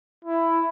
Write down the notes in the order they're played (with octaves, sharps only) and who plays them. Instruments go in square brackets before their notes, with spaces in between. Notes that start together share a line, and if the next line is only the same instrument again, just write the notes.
[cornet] E4